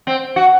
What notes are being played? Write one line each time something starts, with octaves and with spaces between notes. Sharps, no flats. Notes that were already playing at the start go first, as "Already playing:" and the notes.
C4
F#4